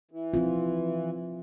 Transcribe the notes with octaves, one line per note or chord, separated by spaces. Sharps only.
E3
F3 C4 F4